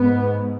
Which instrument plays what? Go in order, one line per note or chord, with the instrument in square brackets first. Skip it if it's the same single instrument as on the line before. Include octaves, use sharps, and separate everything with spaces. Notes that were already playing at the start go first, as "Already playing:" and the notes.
Already playing: [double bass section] G#2 B3